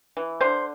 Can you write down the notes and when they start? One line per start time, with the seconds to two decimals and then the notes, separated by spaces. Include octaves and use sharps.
0.17 E3
0.41 D3 C5